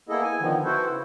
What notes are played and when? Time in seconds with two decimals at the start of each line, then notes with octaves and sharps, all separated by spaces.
0.09 A#3 B3 E4 G#4 A4 D#5
0.23 G#5
0.40 D3 D#3 F3 B3
0.64 E4 F#4 A4 B4 C5
0.89 C#3